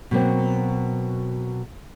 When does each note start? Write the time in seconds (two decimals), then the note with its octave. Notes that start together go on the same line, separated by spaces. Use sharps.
0.11 B2 F#3 A#3 C4